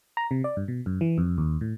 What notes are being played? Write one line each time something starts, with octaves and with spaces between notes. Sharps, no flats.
A#5
C3
D5
G2
B2
F#2
E3
F2
D#2
A2